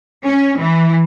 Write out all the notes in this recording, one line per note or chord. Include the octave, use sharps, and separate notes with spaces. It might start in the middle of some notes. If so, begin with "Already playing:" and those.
C#4
E3